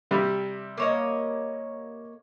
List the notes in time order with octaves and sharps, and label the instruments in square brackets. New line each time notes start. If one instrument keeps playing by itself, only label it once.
[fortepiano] C3 G3
[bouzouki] A#3 C#5 D#5